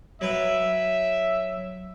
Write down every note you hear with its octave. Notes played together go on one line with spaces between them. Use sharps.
F#3 B4 E5 G5